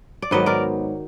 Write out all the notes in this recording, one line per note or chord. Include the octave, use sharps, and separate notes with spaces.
D5
G#2 D#3 F#3 B3 B4 D#5
A#4 D5